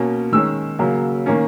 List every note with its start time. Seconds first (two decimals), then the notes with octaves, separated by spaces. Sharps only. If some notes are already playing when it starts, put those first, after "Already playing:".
Already playing: B2 A#3 C#4
0.32 D#3 G#3 C#4 E6
0.79 C#3 F#3 A#3
1.26 D#3 A#3 C#4